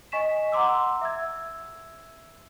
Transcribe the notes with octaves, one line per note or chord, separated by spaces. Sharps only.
D#5 G#5 C#6 B6 E7
F#5 A#5 C6 D6 E6
E5 E6 G#6